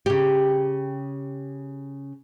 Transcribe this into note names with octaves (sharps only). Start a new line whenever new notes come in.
C#3 G4